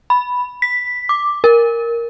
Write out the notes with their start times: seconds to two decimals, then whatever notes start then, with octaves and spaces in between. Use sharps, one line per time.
0.10 B5
0.62 B6
1.09 D6
1.44 A#4